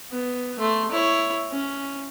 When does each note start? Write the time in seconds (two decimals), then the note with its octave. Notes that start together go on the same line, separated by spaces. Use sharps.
0.11 B3
0.59 A3 C6
0.91 E4 C#5
1.52 C#4